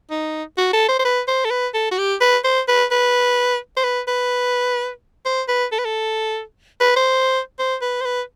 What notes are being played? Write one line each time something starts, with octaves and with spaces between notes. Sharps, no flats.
D#4
F#4
A4
C5
C5
B4
C5
A4
B4
A4
F#4
G4
B4
C5
B4
B4
C5
B4
B4
C5
B4
A4
B4
A4
B4
C5
C5
B4
C5
B4